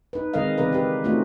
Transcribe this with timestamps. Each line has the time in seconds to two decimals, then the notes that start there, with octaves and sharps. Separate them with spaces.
0.13 D#4 B4
0.34 D#3 G#3 C4 A#4 D#5 F5
0.57 C#3 E3 C4 A#4 B4 D5
0.72 G4 B4
1.04 A3 C4 C#4 D#4 F4 F#4